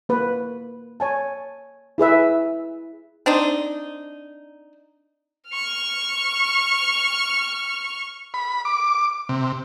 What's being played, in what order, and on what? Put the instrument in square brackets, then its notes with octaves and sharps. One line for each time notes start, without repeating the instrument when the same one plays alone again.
[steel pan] A#3 B4
C#5 G#5 A5
E4 G#4 B4 E5
[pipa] C4 D4 D#4
[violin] C#6 F6
[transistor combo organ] B5
D6
C3